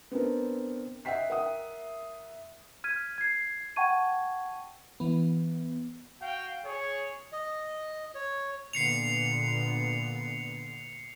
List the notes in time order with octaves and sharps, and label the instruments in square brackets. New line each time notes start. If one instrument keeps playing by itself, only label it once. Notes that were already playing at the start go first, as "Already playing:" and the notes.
[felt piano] B3 C4 D4 A#4
D#5 E5 F#5 G5 B6 C7
A#4 E5 F#5 D#6
[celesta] F6 G#6 B6 D#7
G#6 C7
F#5 G5 A5 C#6 G#6 D#7
[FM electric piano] E3 B3
[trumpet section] F#4 F5 G5
G#4 C#5
[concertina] D#5
C#5
[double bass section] A#2 D3 B3 [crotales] C7 C#7 F7